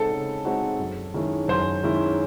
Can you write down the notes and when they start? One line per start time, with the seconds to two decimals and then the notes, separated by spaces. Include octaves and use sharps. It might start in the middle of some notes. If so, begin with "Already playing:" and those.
Already playing: C#3 G#3 C4 D#4 F#4 A4
0.11 C#3
0.45 G#3 C4 D#4 F#4
0.79 F#2
1.14 D#3 G#3 C#4 E4
1.48 F#2 C5
1.83 D#3 G#3 C#4 E4